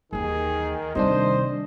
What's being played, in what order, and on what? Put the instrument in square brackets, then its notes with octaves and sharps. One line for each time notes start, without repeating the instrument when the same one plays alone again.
[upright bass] D#2 E3 [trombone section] D#3 [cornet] G#4
[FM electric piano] C3 D#3 D4 [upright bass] G3 A3 [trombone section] C5 [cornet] D#5